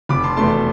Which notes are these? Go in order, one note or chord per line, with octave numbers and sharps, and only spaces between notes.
F1 B5 D6
A5 C6
E2 B2 A3 A5 C6